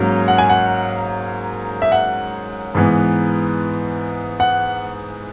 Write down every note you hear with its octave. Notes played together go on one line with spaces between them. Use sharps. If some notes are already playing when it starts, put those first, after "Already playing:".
Already playing: G#2 F#3 A#3 C#4
F#5
G#5
F#5
E5
F#5
G#2 E3 B3
F#5